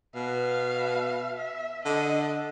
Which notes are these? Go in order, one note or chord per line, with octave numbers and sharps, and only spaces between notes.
B2 F5
E5
D3 D#5